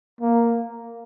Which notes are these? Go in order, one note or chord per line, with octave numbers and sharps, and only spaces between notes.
A#3